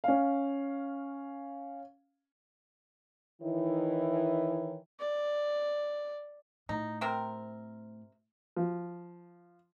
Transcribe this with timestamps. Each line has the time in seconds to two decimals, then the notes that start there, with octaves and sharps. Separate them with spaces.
0.04 C#4 F5
3.42 D#3 E3 D#4 E4 C#5
4.99 D5
6.69 A2 D#4
7.01 C3 C4 A#4
8.56 F3